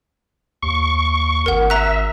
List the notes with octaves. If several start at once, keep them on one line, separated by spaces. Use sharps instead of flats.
D#2 C#6
G#1 A#4 F#5
E5 A#5 F#6